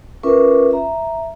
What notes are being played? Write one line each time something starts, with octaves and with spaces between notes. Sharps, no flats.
C#4 F4 A#4 B4 E5 D6
E5 A#5